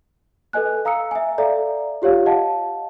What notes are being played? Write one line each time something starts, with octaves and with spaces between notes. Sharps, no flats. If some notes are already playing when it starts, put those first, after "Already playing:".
A4 B4 D#5 G#5 F#6
F5 A#5 D#6 E6 C#7
E5 G#5
A4 D5 E5 F5 A#5
F4 G4 C#5 F5
D#5 F5 F#5 A5